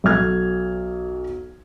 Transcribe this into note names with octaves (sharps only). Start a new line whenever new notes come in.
B1 F#3 A4 F6 G#6